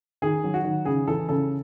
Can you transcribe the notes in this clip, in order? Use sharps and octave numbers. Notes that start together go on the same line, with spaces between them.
D#3 G#4
F#3
F#4
D#3
C#3 G#4
E3 A4
C#3 A4